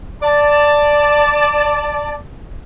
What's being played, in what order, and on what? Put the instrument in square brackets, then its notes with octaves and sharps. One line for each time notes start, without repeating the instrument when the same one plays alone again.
[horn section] D5 A5